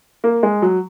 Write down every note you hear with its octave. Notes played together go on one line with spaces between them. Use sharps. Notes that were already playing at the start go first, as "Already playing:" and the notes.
A#3
G#3
F#3